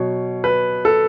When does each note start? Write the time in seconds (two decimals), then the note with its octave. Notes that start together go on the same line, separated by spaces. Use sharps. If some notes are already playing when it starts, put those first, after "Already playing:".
Already playing: B2 F#3 C#5
0.44 B4
0.85 A4